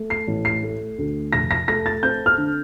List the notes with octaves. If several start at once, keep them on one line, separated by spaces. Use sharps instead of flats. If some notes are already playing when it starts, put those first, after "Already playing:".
Already playing: A3
C7
A1
C7
A3
D2
F1 A#6
A#6
A3 A#6
A6
C4 G6
F6
D3